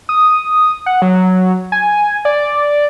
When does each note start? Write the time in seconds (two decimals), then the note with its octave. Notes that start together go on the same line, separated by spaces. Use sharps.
0.09 D#6
0.86 F#5
1.02 F#3
1.72 G#5
2.25 D5